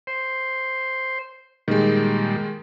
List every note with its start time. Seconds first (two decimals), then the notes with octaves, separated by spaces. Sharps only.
0.07 C5
1.68 A#2 D#3 G3 G#3